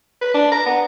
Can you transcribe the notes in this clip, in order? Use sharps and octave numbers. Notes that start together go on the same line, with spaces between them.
B4
D4
A#5
B3